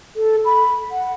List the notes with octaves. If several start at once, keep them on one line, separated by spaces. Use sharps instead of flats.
A4
B5
F#5